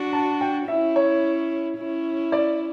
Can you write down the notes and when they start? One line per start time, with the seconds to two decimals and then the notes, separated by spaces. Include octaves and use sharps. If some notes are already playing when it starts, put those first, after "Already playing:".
Already playing: D4 F#4
0.13 A5
0.41 G5
0.68 C#4 E4 E5
0.96 C#5
1.77 C#4 E4
2.32 D5